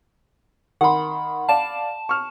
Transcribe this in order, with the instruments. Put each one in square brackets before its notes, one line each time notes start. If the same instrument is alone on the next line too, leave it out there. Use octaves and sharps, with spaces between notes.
[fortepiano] D#3 C6 [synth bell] F#5 B5
[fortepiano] D5 F5 [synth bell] A5 E7
[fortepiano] C#6 F6